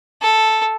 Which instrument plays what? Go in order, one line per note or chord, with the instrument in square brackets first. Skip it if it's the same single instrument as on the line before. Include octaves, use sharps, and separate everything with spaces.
[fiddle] A4